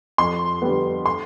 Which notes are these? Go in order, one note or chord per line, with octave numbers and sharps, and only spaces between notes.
F2 C6
D3 G3 B3
C6